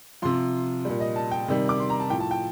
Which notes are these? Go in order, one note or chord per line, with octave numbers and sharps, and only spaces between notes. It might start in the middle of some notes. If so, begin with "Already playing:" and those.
C3 F3 C6
A#2 G3
D#5
A5
G5
C3 D#3 G3
D6
C6
A#5
A5
A2 F3 G5
A5
G5